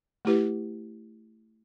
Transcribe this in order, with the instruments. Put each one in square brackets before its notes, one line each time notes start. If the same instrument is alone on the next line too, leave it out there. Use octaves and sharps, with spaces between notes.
[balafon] A3 E4 G4 B4